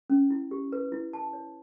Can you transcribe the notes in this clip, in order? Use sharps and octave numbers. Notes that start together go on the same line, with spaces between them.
C#4
E4
G4
B4
E4
A5
C#5